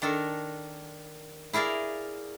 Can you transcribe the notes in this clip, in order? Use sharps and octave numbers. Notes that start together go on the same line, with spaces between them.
D#3 D4 A4 A#4
E4 G#4 A#4 D5 F5